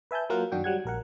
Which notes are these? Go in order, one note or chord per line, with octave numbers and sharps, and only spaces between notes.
B4 E5 G#5 A5 G6
F#3 A#3 F4 A#4 F5 F#5
F#2 D#3 D4 F#4 G5
F#3 G3 F#5 G#6
A#1 A#4 F#5